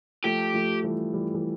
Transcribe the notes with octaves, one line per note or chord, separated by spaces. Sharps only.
F3 A3 G4
F3 A3
E3 G3
E3 G3
E3